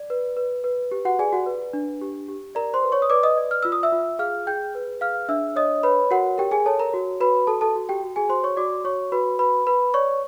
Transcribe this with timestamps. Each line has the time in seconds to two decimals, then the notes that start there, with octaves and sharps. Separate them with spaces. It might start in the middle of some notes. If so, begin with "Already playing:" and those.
Already playing: D5
0.10 B4
0.37 B4
0.64 B4
0.91 G4
1.05 F#4 F#5
1.19 G#4 D5 G#5
1.33 F#4 F#5
1.46 B4
1.73 D4
2.01 G4
2.29 G4
2.55 A#4 D5 A#5
2.74 C5 C6
2.83 B4
2.92 C#5 C#6
3.02 D#6
3.10 B4 D5 D6
3.23 D#5 D#6
3.37 D5
3.51 F6
3.63 F4 E6
3.72 D#6
3.83 E5 E6
3.92 F4
4.19 G#4 F5 F6
4.47 G#4 G5 G6
4.75 B4
5.01 G#4 F5 F6
5.29 D4 E5 E6
5.56 C#5 D#5 D#6
5.83 B4 C#5 B5
6.11 F#4 A#4 F#5
6.38 G4 A#4 G5
6.51 G#4 G#5
6.66 A4 C#5 A5
6.80 A#4 A#5
6.94 F#4
7.20 F#4 B4 B5
7.47 F#4 A4 A5
7.61 A4 A5
7.75 F#4
7.89 G4 G5
8.03 F#4
8.16 G#4 G#5
8.29 F#4 C5 C6
8.43 C#5 C#6
8.57 F#4 D5 D6
8.84 F#4 C#5 C#6
9.12 F#4 B4 B5
9.39 B4 B5
9.67 B4 B5
9.94 C#5 D5 C#6